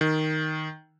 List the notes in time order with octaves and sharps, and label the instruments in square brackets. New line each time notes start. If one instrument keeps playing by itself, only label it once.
[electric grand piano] D#3